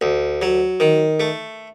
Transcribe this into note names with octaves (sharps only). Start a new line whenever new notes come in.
D2
F#3
D#3
A3